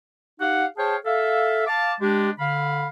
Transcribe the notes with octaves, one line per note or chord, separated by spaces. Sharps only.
D#4 G4 F5 F#5
G#4 C5 C#5 F5 G5 A5
A4 E5 F5
F5 A5 D6
G#3 D4 G4
D3 F5 B5